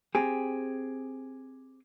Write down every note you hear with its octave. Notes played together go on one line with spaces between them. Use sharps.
C4 G4 G#4